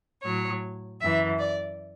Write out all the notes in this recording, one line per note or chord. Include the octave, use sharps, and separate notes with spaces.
A2 F#3 C#5
F#2 E3 E5
D5